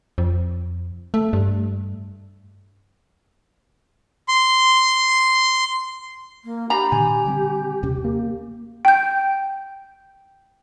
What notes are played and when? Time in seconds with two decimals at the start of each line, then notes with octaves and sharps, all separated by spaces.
0.18 F2
1.14 A3
1.33 G2
4.28 C6
6.44 A#3
6.70 D4 G4 A#5 B5
6.92 A#2 D#3 G#5
7.26 D3 G3 C4
7.83 D#2 C3 C#4
8.04 A#3
8.85 G5 G6